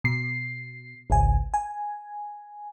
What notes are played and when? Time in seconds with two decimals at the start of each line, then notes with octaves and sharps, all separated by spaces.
0.04 B2 C7
1.10 G#1 C#2 G#5
1.54 G#5